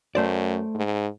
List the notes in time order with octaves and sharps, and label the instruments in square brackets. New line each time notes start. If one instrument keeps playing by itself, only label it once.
[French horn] F#2 [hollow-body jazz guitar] A3 C5 D5
[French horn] G#2